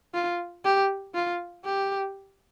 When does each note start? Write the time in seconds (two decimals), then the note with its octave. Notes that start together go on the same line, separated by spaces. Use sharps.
0.14 F4
0.64 G4
1.15 F4
1.65 G4